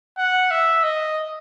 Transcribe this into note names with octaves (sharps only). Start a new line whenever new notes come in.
F#5
E5
D#5